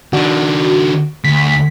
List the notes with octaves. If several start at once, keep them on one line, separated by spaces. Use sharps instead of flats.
D#3 D4 F#4
D2 B6